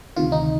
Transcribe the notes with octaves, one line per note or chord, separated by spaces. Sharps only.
D2 C3 D#3 F4
D#4